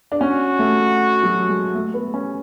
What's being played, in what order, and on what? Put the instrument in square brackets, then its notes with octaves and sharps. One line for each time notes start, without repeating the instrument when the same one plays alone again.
[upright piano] D4
[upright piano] C#4 [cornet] F#4
[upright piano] A3
F#3
G#3
A3
B3
C#4